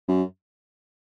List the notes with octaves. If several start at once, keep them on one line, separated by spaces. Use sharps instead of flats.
F#2